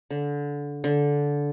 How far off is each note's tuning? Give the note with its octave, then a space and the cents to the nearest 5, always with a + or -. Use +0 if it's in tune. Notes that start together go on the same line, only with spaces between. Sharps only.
D3 -20
D3 -15